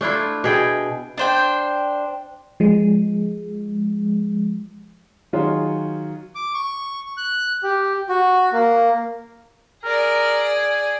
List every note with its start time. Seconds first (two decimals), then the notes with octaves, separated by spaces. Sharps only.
0.01 A3 D4 E4 F4
0.44 B2 G#4 G5
1.18 D4 C5 G5
2.60 F3 G#3
5.33 D#3 F#3 F4 F#4 G#4 C#5
6.35 D6
6.54 C#6
7.17 F#6
7.63 G4
8.09 F#4
8.53 A#3
9.84 G#4 A#4 D5
10.54 G#5